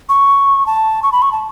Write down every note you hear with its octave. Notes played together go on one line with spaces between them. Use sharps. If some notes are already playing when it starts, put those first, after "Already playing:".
C#6
A5
C#6
B5
C#6
A5